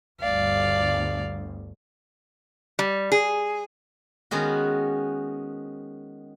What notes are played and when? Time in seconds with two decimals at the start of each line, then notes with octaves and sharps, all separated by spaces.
0.20 G1 D2 D5 F5
2.79 G3
3.12 G#4
4.31 D#3 G#3 B3 C#4 F#4